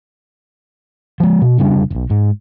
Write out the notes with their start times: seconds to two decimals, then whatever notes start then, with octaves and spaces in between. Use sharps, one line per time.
1.20 F3 G#3
1.41 B2
1.58 F1 C#3 G3 D4
1.91 E1 B1
2.10 G#2